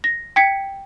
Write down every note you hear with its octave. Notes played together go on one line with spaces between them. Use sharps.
A#6
G5 G#6 B6 C#7